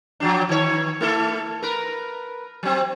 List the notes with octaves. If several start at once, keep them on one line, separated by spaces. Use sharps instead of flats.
F3 F#3 D4
D#3 C#5
A3 E4 A4
A#4 B4
F#3 C4